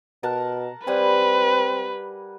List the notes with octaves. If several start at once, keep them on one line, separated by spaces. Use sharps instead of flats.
B2 A#4 F#5 A5
G3 C4 B4 F#5 G#5